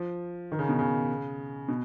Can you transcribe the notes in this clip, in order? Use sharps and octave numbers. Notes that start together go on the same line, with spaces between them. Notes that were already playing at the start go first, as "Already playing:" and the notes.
Already playing: F3
D#3
C#3
B2
C#3
B2